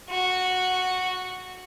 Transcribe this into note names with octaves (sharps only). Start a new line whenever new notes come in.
F#4